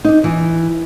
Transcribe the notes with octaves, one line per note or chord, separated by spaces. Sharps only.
D4 D#4
E3